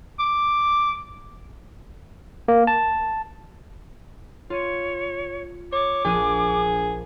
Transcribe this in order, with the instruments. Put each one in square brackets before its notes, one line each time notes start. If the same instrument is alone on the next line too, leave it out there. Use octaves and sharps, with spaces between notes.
[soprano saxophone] D6
[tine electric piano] A#3
A5
[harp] F4 D#7 [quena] C#5
[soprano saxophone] C#5 [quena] D6
[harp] A#1 D4 D#7 [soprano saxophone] G#4